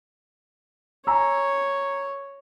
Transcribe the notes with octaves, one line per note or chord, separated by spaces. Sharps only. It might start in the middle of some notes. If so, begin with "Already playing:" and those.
C#5 G#5 A#5 E6